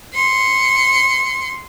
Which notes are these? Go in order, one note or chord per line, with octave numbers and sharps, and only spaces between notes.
C6 C#7